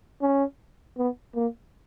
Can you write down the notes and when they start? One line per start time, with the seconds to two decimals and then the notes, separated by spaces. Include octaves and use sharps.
0.22 C#4
0.98 B3
1.35 A#3